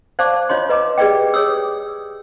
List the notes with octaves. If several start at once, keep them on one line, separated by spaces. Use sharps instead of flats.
C5 D5 F5 A5 C#6 D6
F4 C#5 D#5 C6
B4 D#5 A#5 D6
G4 G#4 B4 D5 D#5 G5
G#4 C#5 D#6 E6